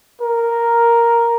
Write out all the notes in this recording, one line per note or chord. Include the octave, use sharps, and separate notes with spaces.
A#4